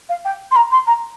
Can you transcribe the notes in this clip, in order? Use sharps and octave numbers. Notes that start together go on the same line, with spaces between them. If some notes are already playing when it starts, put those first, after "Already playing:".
F5
G5
C6
A#5
C6
A#5